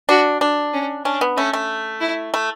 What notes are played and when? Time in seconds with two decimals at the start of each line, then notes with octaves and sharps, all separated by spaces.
0.09 D4 F#4
0.41 D4
0.74 C#4
1.05 C#4 D4
1.21 B3
1.37 A3 C#4
1.53 A3
2.01 E4
2.34 A3